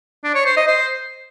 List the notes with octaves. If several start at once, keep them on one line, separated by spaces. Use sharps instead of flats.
D4
C#5
C5
D#5
C5